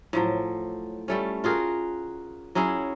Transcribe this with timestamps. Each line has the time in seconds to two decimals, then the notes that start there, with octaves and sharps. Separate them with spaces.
0.13 A2 F3 F#3
1.08 G3 A3 C#4
1.44 F4 F#4 G#4 A#4
2.55 F#3 C#4 E4 G#4